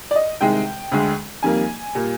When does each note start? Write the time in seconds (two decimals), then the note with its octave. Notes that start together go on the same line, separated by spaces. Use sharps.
0.11 D5
0.15 D#5
0.41 C2 C3 D#3 G#3 G5
0.92 D2 D3 G#3
1.43 F2 D#3 G3 A#3 G#5
1.95 A#2 G3 A#3